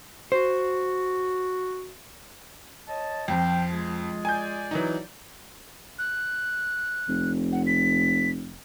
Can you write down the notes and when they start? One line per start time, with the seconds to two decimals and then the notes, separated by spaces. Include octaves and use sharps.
0.32 F#4 C5
2.89 C#5 D#5 A5
3.28 F2 F3 G5
3.71 G#3 F4 G#4
4.25 D5 G#5 G6
4.71 E3 F#3 D#4
5.99 F#6
7.08 F1
7.52 F#5
7.66 B6